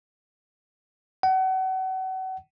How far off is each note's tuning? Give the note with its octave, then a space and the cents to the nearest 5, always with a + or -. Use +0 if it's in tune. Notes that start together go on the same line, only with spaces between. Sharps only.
F#5 +35